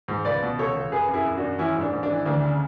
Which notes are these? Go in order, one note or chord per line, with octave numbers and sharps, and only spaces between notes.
G#2
C#2 B4 D5
B2
C#2 A4 C#5
C#2
F#2 G#4 B4
F#2
E4 G#4
F#2
D4 F#4
F#2
E3 C#4 E4
G#2
D4
G#2
D4
E3
D2 D4
C#3